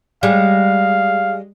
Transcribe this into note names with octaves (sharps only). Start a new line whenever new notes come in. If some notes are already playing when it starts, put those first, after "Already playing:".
G3 G#3 F5